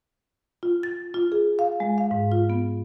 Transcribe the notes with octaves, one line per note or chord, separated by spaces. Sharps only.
F4
A6
F4
G#4
F5
G#3
F5
G#2
F4
B3